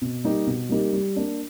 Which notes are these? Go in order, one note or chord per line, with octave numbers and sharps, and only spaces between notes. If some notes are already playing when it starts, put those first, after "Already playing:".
B2
G3 A#3 D#4 G4
B2
G3 A#3 D#4 G4
G3
A#3 D4